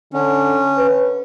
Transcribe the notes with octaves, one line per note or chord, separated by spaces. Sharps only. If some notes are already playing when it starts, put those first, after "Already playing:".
D3 C#4
B4